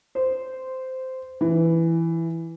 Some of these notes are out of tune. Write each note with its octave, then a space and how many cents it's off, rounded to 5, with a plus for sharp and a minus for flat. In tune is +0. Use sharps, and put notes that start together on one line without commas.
C5 -10
E3 +5